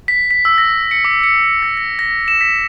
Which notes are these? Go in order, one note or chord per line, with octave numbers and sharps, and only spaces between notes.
B6
B6
E6
A#6
C#7
D6
C#7
A#6
A#6
A#6
E7
B6